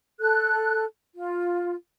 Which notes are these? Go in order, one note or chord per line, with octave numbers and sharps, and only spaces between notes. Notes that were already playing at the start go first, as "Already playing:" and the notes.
A4 F#6
F4